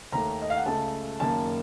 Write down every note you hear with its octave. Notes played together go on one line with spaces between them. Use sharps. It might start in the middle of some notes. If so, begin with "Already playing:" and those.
D#2 D#3 A3 A#5
D#5
F5
F#5
C#2 C#3 A3 A5
F#1 F#2 D#3 A#3 A5